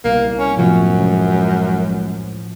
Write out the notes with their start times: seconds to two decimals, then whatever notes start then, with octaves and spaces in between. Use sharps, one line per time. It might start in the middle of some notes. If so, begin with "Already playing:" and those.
0.04 C2 B2 G3 A#3
0.38 C#4
0.57 F#2 A2 C3 F3 B3
1.01 B1 G#3 C#4